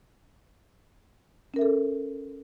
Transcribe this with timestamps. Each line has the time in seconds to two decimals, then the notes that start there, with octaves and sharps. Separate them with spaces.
1.54 C#4
1.56 A#4
1.59 E5
1.61 A4